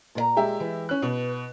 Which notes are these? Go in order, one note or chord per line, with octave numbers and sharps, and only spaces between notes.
A#2 C#5 A#5
G#3 G4 E5
E3
C#4 F#6
B2 B4